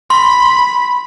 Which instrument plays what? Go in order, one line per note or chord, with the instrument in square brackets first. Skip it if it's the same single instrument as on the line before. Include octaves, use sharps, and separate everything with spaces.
[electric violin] B5 [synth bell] C6